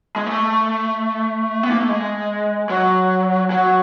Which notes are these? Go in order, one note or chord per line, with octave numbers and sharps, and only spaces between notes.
G#3
A3
B3
A#3
A3
G#3
F#3
F#3